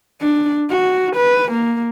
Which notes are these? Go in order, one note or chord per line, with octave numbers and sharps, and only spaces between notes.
D4
F#4
B4
A#3